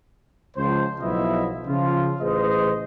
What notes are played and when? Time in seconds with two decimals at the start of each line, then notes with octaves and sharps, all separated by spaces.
0.57 C#2 F3 C5
1.01 B1 B2 F3 E4 D#5 E5
1.68 C#3 F3 F4
2.21 A1 G#4 B4 C5 D#5